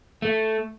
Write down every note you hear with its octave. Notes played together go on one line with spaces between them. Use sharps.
A3